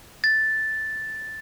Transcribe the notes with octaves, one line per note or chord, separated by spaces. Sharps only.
A6